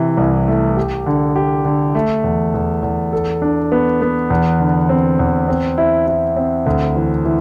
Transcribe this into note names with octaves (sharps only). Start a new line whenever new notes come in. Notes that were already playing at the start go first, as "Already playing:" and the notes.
Already playing: C3 E3
C2
A3
G4
D3
G4
D3
A3
E2
E2
E2
A4
D4
B3
B3
E2
D3
C4
E2
C4
E4
E4
C4
D2
E3
E3